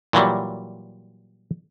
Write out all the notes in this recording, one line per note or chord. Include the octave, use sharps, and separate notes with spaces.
A#2 E3 F#3 G3